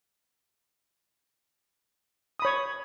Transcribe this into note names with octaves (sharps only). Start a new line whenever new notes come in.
C#5 B5 D#6